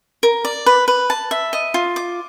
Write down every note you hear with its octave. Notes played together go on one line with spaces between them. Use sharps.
A#4
D5
B4
B4
A5
E5
D#5
F4
D6